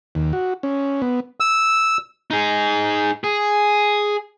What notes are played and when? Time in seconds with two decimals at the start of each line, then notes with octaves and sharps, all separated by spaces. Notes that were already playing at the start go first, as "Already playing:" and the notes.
0.15 D#2
0.33 F#4
0.63 C#4
1.02 B3
1.40 E6
2.31 D#4 G#4
3.24 G#4